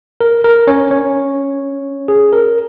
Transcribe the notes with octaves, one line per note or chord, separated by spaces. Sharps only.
A#4
A#4
C#4 C#5
C#4 C#5
G#4
A#4